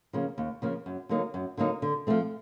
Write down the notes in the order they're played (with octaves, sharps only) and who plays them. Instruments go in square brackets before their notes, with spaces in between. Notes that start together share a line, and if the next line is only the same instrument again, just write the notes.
[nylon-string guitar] C#3 F3 A#3
D#2
C#3 F3 A#3
F#2
D3 F#3 A#3 D#4
F#2
D3 F#3 A#3 D#4
D3
F3 A3 C4